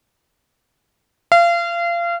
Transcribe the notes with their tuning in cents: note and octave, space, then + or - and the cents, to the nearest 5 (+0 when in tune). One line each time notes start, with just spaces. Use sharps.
F5 -30